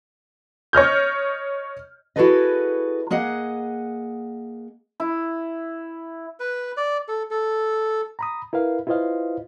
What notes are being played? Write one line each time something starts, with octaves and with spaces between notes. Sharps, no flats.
C#5 D#5 F6 G6
E4 F#4 G#4 A4 B4 D#5
A#3 G#4 D#5 F#5
E4
B4
D5
A4
A4
A#5 B5 D#6
E4 A#4 B4 F5
E4 F4 B4 C5 D#5 F5